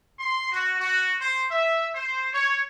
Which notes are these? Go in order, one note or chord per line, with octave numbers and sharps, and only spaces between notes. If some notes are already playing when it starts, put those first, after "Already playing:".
C6
F#4
F#4
C5
E5
C5
C#5